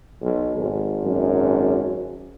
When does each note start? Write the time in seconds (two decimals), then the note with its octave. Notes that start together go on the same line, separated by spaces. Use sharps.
0.22 B1
0.57 G#1
1.04 F#2